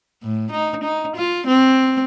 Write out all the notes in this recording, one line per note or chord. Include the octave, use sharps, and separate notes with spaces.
A2
D#4
D#4
F4
C4